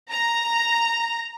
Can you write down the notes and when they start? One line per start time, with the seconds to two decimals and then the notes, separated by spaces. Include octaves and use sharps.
0.10 A#5